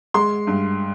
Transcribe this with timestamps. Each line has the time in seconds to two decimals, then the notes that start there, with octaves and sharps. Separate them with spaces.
0.14 G#3 C6
0.47 G2